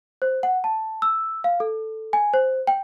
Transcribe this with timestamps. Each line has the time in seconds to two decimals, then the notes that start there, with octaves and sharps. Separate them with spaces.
0.22 C5
0.43 F#5
0.64 A5
1.02 E6
1.44 F5
1.60 A4
2.13 G#5
2.34 C5
2.67 G5